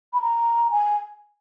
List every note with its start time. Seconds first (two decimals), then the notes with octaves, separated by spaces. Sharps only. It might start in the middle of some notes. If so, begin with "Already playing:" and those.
0.13 B5
0.22 A#5
0.71 G#5